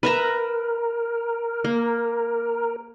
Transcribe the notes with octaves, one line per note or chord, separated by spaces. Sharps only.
A#4 B4 E5 A#5
A#3